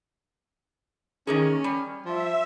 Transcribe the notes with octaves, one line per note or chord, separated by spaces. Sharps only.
D#3 A#3 C#4 G#4
G3
F3 E5